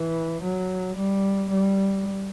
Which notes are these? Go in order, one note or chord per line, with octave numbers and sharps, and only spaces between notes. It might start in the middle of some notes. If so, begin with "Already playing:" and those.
Already playing: E3
F#3
G3
G3